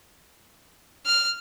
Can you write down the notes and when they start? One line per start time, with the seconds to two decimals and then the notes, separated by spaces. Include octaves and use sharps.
1.06 F6